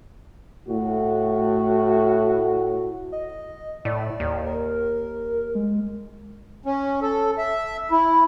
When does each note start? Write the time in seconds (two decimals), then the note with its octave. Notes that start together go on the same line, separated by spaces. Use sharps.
0.69 A2 F#4
3.12 D#5
3.85 A2 D5
4.20 D#2
4.46 A#4
5.55 G#3
6.66 C#4
7.02 A4
7.38 E5
7.91 E4